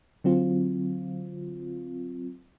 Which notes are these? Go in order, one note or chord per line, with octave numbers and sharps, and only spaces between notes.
D3 F#3 C4 F4